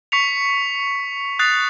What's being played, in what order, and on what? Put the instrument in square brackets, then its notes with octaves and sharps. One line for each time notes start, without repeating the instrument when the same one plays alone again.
[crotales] C#6 B6 C#7 F7
D#6 F#6 A6 C7 F7